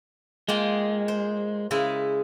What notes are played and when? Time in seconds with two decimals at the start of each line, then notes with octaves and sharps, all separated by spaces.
0.48 G#3 A#3 F4 G5
1.08 C5
1.71 C#3 G#3 E4